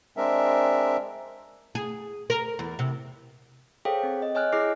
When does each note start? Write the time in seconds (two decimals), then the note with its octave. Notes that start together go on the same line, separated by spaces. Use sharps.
0.17 G#3 C4 D4 A#4 E5
1.75 G#4
2.30 A#4
2.59 E2
2.79 C3
3.85 G#4 A4 C5 C#5 F5 G5
4.03 C4
4.22 D#5
4.35 C#5 D#5 G#5 F6 F#6
4.53 E4 G#4 C#5 D6 F6 C7